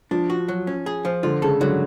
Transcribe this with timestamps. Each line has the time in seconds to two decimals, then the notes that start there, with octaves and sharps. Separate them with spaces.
0.11 F3 D4
0.30 F#4
0.48 F#3
0.67 C#4
0.86 G#4
1.05 F3
1.23 D3 F4
1.42 C#3 A4
1.61 D3 F#3